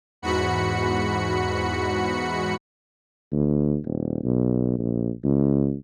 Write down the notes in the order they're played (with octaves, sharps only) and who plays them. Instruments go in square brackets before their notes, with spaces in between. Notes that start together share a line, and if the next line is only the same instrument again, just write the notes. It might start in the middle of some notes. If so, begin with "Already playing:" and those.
[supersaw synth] E2 G#2 F#4 B5 C#7
[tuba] D2
D#1
B1
A#1
C#2